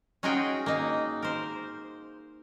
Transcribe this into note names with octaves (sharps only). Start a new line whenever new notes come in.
C#4 D#4 F4 F#4 G#4 G5
A#3 D#4
A#4 C5